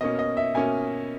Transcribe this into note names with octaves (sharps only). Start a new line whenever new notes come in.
B2 A#3 C#4 D#5
D#5
E5
B2 A#3 C#4 G#5